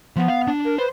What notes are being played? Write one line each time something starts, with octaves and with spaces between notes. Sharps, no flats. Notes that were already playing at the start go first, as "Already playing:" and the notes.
F3 B3
F5
D4
A#4
B4 C5